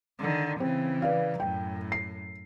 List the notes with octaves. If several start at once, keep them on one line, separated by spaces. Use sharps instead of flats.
D3 D#3
C#3 E3 C4
B4 D5 F5
F#2 A2 G5
C7